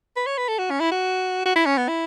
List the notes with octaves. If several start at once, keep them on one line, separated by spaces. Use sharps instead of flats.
B4
C#5
B4
A4
F#4
C#4
E4
F#4
F#4
E4
C#4
B3
E4